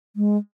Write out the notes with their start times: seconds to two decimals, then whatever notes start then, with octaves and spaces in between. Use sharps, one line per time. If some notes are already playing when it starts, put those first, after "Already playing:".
0.16 G#3